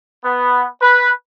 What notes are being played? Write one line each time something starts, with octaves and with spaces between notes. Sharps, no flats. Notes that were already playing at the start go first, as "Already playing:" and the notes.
B3
B4